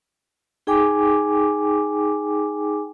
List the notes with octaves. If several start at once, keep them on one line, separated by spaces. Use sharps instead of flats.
D#4 G#4 G5 G#5 D6